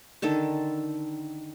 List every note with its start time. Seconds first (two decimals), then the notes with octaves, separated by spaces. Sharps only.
0.22 D3 D#3 A4